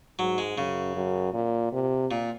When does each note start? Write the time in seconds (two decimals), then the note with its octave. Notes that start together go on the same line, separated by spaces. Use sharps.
0.19 G#2 F#3
0.38 G#3
0.58 F#2 C#3
0.96 F#2
1.33 A#2
1.72 C3
2.11 A#2